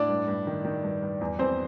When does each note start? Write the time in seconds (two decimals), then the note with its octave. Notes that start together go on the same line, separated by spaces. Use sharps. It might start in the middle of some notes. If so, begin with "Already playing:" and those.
Already playing: A2 D4 D5
0.09 G2
0.28 G2
0.47 D#3
0.65 D#3
0.84 G2
1.02 G2
1.21 E2
1.39 E2 C4 C5